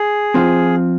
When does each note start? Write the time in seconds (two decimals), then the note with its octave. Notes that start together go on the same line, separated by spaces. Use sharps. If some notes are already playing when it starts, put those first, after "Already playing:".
Already playing: G#4
0.34 F3 C4 F4 C5